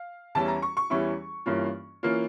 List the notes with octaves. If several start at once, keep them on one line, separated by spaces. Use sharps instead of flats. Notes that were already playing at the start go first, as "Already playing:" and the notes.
Already playing: F5
E2 E3 G3 C#4 E4 A5
A#5
C#6
C#6
E2 E3 G3 C#4 E4 C#6
G2 E3 A#3 C#4 F4
E3 A#3 C#4 F4